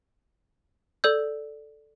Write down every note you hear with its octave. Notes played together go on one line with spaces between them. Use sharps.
A4 D5 E6 G6